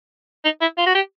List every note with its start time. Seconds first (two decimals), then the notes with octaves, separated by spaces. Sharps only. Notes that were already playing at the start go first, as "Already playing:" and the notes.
0.45 D#4
0.61 E4
0.78 F4
0.86 F#4
0.95 G4